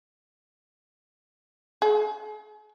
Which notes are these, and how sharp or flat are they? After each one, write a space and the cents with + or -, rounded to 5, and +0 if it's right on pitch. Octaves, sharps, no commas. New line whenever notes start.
G#4 +45